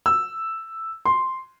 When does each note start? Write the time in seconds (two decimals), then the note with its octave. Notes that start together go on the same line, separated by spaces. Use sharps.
0.06 E6
1.05 C6